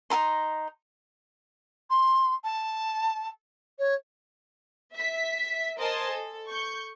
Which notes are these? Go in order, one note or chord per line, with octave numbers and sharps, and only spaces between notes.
D#4 F4 A#5 C6
C6
A5
C#5
E5 B6
A#4 C5 D#5 G#5 A5 C6
A4
C#6 G6